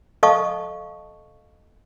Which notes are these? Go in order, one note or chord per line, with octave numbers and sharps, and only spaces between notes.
A4 D#5 F5 A5 C#6 D#6